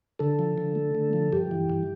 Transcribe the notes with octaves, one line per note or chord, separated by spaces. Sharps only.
D3 A4
F3
D3
A3
D3
F3
G2 G4
E3
G2